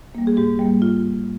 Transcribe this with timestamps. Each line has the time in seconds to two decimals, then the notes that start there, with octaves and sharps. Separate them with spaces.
0.15 G3 A#3
0.27 G#4
0.37 G#2 G4
0.59 G3 A#3
0.82 F4